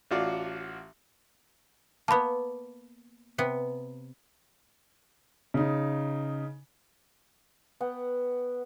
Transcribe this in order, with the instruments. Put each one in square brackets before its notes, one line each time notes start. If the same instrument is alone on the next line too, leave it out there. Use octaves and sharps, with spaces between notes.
[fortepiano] A1 F4 F#4 D5
[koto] A#3 B3 [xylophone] A5 B5
[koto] C3 B3
[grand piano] C#3 D#4
[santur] B3 F#5 G5